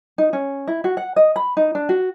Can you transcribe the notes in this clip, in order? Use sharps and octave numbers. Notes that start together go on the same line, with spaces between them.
D#4
C#4
E4
F#4
F#5
D#5
B5
D#4
D4
F#4